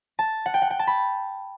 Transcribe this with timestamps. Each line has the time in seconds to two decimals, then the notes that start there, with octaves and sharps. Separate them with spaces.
0.19 A5
0.46 F#5
0.54 G5
0.62 F#5
0.70 G5
0.79 A5
0.87 B5